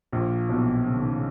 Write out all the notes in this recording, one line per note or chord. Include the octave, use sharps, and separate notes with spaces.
A#1 A#2
B1 B2
C#3
D#3
C#3